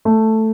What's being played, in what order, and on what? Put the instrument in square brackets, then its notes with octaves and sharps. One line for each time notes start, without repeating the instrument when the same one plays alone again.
[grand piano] A3